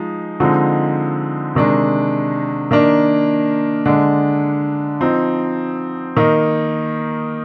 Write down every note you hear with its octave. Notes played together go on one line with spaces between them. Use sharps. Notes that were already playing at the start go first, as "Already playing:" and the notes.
Already playing: F3 G#3 D#4
D3 F3 G#3 C4 D#4
C3 D#3 G#3 D4
D#3 A#3 D4
D3 G#3 D4
F3 C4 D#4
D#3 A#3 D#4